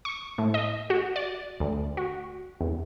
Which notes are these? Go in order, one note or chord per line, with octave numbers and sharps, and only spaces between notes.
C#6
A2
D#5
F#4
D5
D2
F#4
E2